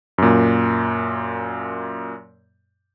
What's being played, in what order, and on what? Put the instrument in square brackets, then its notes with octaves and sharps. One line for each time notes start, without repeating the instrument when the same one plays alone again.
[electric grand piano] F#2 A#2